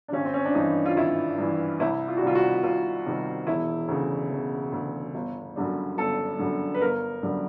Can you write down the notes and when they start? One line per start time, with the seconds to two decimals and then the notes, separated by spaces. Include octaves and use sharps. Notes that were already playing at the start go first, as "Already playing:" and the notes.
0.08 D4
0.13 G#1 C#4
0.25 C4
0.34 C#4
0.45 D4
0.55 G2 E3 D#4
0.86 F4
0.96 G#1 E4
1.38 G2 E3
1.80 C2 E4
2.08 F4
2.17 F#4
2.22 C3 D#3 G3 F4
2.35 F#4
2.63 C2 F4
3.06 C3 D#3 G3
3.47 E1 E4
3.88 D2 C#3
4.30 E1
4.72 D2 C#3
5.14 G1
5.56 F#2 D3 G3
5.97 G1 A4
6.39 F#2 D3 G3
6.74 B4
6.81 G1 A#4
7.23 F#2 D3 G3